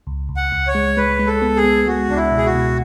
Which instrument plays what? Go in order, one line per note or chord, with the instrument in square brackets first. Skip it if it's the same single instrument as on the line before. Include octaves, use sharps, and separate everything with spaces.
[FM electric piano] C#2
C#2
[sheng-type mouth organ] F#5
[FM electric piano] C#2
[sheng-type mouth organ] C#5
[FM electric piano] G#3
[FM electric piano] G#3 [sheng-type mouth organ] B4
[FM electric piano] G#3
[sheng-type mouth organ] A4
[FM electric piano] B3
[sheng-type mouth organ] G#4
[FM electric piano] B3
[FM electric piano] G#3 [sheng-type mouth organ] F#4
[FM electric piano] C#2 [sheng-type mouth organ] D4
[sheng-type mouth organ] E4
[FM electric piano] B2
[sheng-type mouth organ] G#4
F#4
[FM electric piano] B2